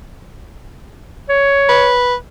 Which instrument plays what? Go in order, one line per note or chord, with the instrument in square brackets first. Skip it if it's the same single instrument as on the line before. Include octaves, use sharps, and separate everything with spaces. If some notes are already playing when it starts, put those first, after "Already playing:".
[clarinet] C#5
[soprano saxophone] B4